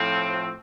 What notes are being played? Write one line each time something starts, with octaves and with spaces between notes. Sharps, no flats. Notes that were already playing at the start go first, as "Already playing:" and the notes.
Already playing: A2 F3 C4